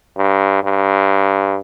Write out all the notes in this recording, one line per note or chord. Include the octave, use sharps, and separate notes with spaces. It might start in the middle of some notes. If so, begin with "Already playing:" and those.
G2
G2